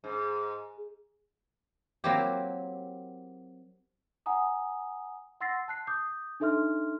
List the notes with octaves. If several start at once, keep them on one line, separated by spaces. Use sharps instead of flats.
G#2
F#3 A#3 C4 E4 G4
F#5 G#5 A#5 D#6
F#5 C6 E6 A6 A#6 C7
A5 F#6 C7
D6 D#6 G6
D4 D#4 A4 E5 C6 F6